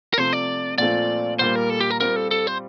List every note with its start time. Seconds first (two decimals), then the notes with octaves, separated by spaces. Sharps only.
0.13 A#4
0.18 C3 F3 A3 C5
0.33 D5
0.78 A#2 F3 A3 C4 F4 D5
1.39 A#2 G3 A#3 C5
1.55 A#4
1.70 A4
1.81 G4
1.90 A#4
2.00 G3 C4 F4 A#4
2.16 A4
2.31 A4
2.47 C5